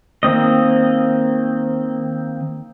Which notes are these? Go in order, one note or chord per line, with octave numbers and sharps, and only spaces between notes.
D#3 A#3 C4 D#5